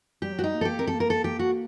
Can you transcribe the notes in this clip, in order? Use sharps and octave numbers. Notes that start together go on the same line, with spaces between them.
G3 G4
F#3
F#4
G3 D#4
A#3
A4
A#3 G4
C4 A#4
A4
A#3 A#4
A4
G4
F#4